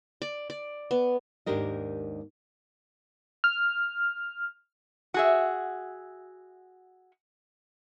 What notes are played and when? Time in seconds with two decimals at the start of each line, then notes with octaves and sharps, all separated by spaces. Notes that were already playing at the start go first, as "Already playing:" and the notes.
0.22 D5
0.50 D5
0.91 B3
1.46 D#2 G#2 D4 G4 A#4 D#5
3.44 F6
5.14 F#4 G#4 E5